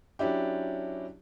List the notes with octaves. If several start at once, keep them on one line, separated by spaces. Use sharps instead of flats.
F#3 C#4 D4 E4 G4